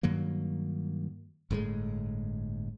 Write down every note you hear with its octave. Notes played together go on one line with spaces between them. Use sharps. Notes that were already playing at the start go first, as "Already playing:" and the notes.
G2 D#3 F#3 A#3
G1 A2 C#3 G#3